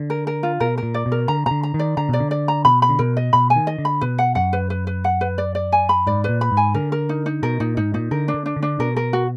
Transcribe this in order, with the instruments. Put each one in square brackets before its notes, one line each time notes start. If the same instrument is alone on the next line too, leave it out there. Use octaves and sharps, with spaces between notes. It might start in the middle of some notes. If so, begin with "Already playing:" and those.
Already playing: [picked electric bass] D3
[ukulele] A#4
A#4
F4
[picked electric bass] B2 [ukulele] A#4
[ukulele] A#4
[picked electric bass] A#2
[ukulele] D5
[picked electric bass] B2
[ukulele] A#4
[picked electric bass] D3 [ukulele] A#5
[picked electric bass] B2 D3 [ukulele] A#5
[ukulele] A#5
[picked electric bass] D#3
[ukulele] D5
[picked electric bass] D3 [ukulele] A#5
[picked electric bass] B2 [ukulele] D5
[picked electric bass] D3
[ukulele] D5
A#5
[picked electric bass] B2 [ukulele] B5
[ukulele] B5
[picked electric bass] D3
[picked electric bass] B2 [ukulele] A#4
[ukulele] D#5
[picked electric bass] B2 [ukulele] B5
[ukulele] G#5
[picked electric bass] D#3
[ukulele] D#5
[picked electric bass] D3
[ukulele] B5
[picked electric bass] B2 [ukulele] B4
[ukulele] F#5
[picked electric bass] F#2 [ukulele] F#5
[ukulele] B4
B4
B4
F#5
B4
D5
D5
G#5
B5
[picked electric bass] G#2 [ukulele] D5
[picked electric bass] A#2 [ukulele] B4
[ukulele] B5
[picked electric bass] G#2
[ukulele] G#5
[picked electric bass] D3 [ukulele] A#4
[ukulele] A#4
D#4
D#4
[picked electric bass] B2 [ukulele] A#4
[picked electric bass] A#2 [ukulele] D#4
[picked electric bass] G#2 [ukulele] D#4
[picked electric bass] A#2 [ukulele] D#4
[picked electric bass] D3 [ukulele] A#4
[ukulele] D4
[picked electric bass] D3
[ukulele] D4
[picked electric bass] D3
[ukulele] D4
[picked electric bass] B2 [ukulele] A#4
[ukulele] A#4
F#4